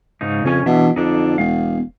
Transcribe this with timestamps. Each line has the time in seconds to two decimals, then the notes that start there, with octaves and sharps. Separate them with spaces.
0.21 G#2 C#3 D#4
0.45 F2 C#3 C#4 G#5
0.66 B2 E3 D4 E5
0.96 F2 D3 D4 D#4
1.38 E1 B3 F5